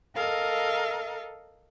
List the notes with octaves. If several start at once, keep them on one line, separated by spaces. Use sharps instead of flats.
A4 A#4 D#5 F5